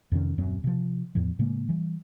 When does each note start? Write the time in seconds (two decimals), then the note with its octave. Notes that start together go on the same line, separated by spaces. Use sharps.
0.12 F2 C3 D#3 C#4
0.38 D#1 F#2 F#3 C4
0.64 C3 F3
1.15 E2 A2 F3
1.39 A2 C#3 G#3 A#3
1.69 E3 G3